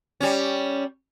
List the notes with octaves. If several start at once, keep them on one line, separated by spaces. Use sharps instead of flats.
G3 C#4